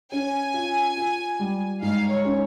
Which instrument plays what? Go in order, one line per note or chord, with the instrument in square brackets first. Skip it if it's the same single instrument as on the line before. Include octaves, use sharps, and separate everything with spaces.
[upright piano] C#4 [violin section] G#5
[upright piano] F4
F4
G3
[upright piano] G#2 [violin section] F5
[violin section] C#5
[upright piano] C#4